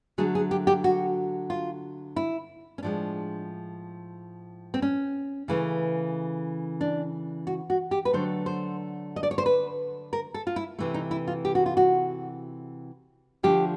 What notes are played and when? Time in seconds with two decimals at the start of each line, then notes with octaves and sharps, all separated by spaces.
0.18 D3 F#3 A3 G#4
0.35 G#4
0.51 G4
0.67 G4
0.84 F#4
1.50 F4
2.16 E4
2.78 C#4
2.83 A2 F3 G#3 D4
4.74 C4
4.82 C#4
5.48 C#3 E3 A3
6.81 D4
7.47 F#4
7.70 F#4
7.91 G4
8.05 B4
8.13 D3 F#3 A3 C5
8.46 C5
9.16 D#5
9.23 D5
9.31 C#5
9.38 C5
9.46 B4
10.13 A#4
10.34 A4
10.47 F4
10.56 E4
10.79 C3 E3 A3
10.94 D#4
11.11 E4
11.27 F4
11.45 G4
11.55 F#4
11.66 F4
11.77 F#4
13.43 D3 F3 A3 G4